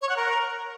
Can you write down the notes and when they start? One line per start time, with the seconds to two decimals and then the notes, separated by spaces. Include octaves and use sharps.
0.02 C#5
0.09 F#5
0.17 A#4